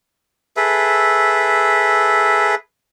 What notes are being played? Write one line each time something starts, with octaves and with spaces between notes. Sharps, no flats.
G#4 A4 B4 E5